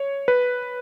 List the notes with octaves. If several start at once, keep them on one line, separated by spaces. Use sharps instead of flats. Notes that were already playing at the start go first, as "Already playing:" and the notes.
Already playing: C#5
B4